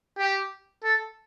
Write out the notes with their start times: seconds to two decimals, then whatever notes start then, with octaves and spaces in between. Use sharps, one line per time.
0.18 G4
0.84 A4